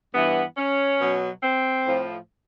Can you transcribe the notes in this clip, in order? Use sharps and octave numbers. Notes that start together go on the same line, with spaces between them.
G2 E3 B3
C#4
B2 F#3
C4
A2 F3